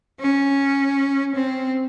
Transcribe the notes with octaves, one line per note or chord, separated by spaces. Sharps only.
C#4
C4